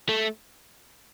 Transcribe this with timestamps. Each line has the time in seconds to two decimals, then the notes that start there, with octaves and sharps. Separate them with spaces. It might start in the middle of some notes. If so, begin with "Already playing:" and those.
0.09 A3